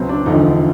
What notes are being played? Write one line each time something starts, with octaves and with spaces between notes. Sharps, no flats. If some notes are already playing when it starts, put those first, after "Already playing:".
Already playing: C#2 B2 F#3 C4
D4
E1 D2 D3 F3 D#4